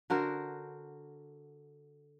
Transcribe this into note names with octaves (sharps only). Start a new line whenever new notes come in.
D3 F#4 A#4 C5